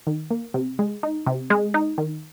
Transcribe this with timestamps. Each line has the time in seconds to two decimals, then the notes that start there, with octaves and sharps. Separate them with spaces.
0.07 D#3
0.31 A#3
0.54 C3
0.79 G#3
1.03 D#4
1.26 C3
1.50 G#3
1.74 D#4
1.98 D#3